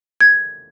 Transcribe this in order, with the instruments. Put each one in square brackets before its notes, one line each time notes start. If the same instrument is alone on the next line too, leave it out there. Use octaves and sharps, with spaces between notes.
[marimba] G#6